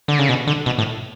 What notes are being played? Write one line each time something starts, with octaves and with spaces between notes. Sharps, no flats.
D3
C#3
B2
D3
B2
A2